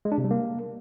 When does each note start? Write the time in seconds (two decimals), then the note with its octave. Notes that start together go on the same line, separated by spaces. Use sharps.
0.05 G#3
0.12 D4
0.18 C3
0.24 G3
0.31 A#3